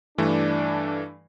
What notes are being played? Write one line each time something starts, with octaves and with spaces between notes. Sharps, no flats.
G2 E3 A3 D4